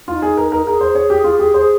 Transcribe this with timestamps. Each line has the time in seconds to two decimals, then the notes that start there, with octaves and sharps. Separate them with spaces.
0.08 D#4 F4
0.22 G#4
0.37 A#4
0.52 A#4
0.66 G#4 A#4
0.81 C5
0.95 C#5
1.10 G4
1.24 F4
1.39 G4
1.54 C5